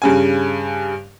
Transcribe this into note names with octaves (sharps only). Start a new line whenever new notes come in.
G2 C#3 G#5